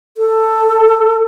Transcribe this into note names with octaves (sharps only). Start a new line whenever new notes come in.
A4